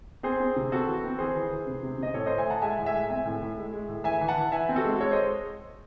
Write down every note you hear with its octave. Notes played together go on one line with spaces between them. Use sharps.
C4 G#4 C5
C4
C3
C4 F#4 A4
E3
C4
E3 G#4 C5
E3
E3
C3
C3
C3 D#5
A2 A4 C#5
A2 C5 D#5
E5 G#5
A2 F#5 A5
G#3 E5 G#5
A2
E5 G#5
G#3
C4 E5 G#5
A2
A2
G#3
G#3
A2
E3 E5 G#5
E3
F#5 A5
E3
E3 E5 G#5
C4
F#4 A4
G#3
G#3 A4 C#5
C5 D#5